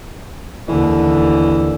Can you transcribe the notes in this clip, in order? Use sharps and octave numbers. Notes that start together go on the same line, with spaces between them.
D#2 D3 E3